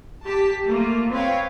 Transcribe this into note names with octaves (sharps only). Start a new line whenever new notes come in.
G4 A5 B6
A3 A#3 F4
C4 B4 C#5 F5 G5